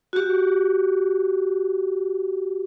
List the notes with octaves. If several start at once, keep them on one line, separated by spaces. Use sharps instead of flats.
F#4 G4